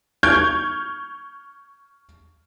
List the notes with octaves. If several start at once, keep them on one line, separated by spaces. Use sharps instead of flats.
C#6 F6 G6 G#6 D7